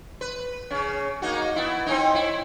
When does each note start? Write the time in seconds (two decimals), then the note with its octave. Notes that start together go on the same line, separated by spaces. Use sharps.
0.21 B4
0.70 C#3 C#4
1.22 A#3 D#4 F#4
1.56 B3 E4
1.86 C4 C#4 D#4
2.15 E4